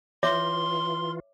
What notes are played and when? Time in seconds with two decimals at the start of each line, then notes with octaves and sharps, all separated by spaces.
0.23 E3 F4 C#5 E5 C6 D6